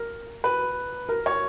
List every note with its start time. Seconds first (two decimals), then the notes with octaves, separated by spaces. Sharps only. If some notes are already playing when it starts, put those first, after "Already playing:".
Already playing: A#4
0.44 B4
1.09 A#4
1.26 C#5